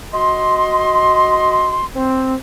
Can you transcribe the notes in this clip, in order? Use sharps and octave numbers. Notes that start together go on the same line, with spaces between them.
F#4 D#5 C6
C4